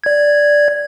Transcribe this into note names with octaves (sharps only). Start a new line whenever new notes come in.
D5 G#6